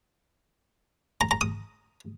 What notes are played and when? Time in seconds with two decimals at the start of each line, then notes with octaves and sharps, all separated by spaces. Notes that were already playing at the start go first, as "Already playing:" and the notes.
1.21 A#5
1.31 A#5
1.41 D#6